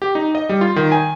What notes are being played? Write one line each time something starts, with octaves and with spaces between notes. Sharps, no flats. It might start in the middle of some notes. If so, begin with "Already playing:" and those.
G4
D#4
D#5
G3
F4
D#3
G#5